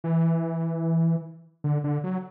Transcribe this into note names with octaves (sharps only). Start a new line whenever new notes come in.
E3
D3
D3
F#3